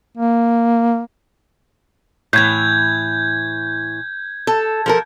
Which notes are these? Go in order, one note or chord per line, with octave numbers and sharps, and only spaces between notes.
A#3
A2 E3 G6 G#6
A4
F3 A4 A#4